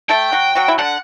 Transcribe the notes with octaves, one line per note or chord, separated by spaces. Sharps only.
A3 A4 G5
F#3 F#4
F#3 F#4
E4
D3 D4 F#5